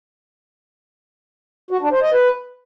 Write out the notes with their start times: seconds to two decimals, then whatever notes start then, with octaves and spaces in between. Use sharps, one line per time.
1.71 F#4
1.81 D4
1.92 C5
2.02 D#5
2.12 B4